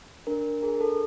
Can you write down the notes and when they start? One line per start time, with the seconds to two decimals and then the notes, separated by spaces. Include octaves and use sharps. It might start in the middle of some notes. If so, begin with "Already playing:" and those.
0.27 D4 A#4
0.62 G#4 A#4
0.81 A4